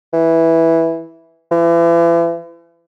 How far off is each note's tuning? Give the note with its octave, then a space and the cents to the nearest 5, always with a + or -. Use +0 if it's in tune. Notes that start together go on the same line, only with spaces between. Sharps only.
E3 -5
E3 +40